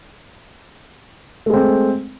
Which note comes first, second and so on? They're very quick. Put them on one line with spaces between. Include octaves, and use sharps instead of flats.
A3 G#3 C4